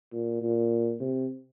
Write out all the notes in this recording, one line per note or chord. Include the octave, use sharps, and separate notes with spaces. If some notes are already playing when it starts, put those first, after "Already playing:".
A#2
A#2
C3